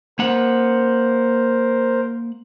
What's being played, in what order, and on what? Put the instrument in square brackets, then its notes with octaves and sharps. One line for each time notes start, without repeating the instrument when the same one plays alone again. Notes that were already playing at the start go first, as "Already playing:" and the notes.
[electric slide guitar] A#3 F#5 [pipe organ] A#4 C5